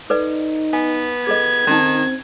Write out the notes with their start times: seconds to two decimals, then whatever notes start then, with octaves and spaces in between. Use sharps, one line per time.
0.10 D#4 A4 B4 D5
0.73 B3 G#5
1.27 G#4 A4 D#5 G#6
1.67 D#3 C4 C#4 D#4